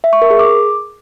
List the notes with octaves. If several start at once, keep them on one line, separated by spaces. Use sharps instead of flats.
E5
C#6
A#4
G#4
D6